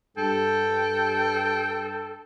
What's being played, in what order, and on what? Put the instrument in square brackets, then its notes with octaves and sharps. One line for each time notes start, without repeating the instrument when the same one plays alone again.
[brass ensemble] G2 [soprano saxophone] A4 [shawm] G5